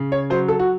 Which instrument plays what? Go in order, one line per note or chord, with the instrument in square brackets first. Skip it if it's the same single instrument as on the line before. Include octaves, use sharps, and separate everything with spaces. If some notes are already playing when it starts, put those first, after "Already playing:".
Already playing: [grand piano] C#3
C#5
F#3 C5
A4
F#4